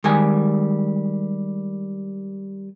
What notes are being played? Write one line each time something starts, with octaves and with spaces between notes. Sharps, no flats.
D#3 G3 G#3 G#5